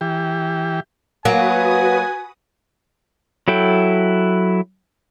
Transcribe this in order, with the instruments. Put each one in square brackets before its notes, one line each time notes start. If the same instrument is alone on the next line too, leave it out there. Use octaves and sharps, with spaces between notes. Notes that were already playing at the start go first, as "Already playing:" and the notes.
[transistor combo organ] E3 G4
[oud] F#3 A#3 [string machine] F#4 B4 D#6 [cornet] G#5
[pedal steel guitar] F#3 E4 A4 G5